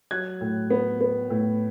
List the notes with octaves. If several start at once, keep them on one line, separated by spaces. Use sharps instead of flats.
F#3 F#6 G#6
A2
B3
B3
A2